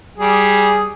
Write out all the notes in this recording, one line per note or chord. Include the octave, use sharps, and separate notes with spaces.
G3 G#4